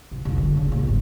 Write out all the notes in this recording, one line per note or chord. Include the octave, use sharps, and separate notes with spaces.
C2
F1 C2
D3
C#3
C#2 A#2
G1 G#2